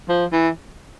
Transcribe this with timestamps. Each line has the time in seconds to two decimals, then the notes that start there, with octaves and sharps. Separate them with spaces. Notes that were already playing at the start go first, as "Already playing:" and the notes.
0.09 F3
0.32 E3